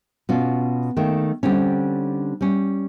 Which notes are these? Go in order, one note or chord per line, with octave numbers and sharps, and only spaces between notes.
B2 C#4 F4
D#3 A3 A#3
D3 G3 C4 C#4
G3 C#4